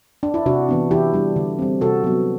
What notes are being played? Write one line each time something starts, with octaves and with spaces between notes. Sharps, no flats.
D4
E4
C3 D4 F#4
E3 B3 D4
E3 E4 G4
G3 D4
D3
G3 C4
C3 F#4 A4
F#3 B3